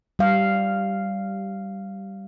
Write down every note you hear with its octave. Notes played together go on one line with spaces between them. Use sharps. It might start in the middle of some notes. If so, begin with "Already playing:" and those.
G3 F5